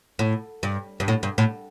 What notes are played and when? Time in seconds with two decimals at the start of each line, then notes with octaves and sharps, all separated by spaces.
0.19 A2
0.63 G2
1.00 G2
1.08 A2
1.23 G2
1.38 A2